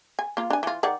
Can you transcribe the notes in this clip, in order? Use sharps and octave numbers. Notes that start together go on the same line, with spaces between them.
G#5
A#3 F4
D4 G#5
E3 F4
D#3 D5 F#5